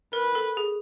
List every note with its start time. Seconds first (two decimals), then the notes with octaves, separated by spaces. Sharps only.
0.13 A#4 B4
0.35 A4
0.57 G#4